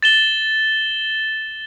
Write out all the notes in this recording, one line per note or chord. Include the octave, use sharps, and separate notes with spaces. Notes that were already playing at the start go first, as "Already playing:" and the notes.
A6 E7 G7